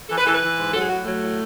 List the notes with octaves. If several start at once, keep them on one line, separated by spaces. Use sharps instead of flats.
E3 A4
B4
E3 A4
B4
E3
G#2
F#3 A4
G#4
A2 F#4
F#3 A3
A2